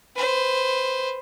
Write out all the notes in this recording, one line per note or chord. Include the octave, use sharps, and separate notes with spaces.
B4 C5